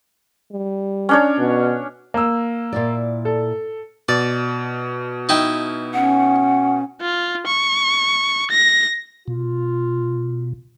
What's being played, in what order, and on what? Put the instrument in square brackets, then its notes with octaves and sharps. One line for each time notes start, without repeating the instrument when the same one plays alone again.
[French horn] G3
[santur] C#4 D4 C#5
[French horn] B2
[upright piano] A#3 E6
[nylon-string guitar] A#2 E4 D5
[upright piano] A4
[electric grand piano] B2 [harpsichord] D5
[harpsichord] D#4 E4 G5
[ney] C#4 [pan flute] F#5
[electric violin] F4
C#6
A#6
[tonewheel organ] B2 [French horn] F4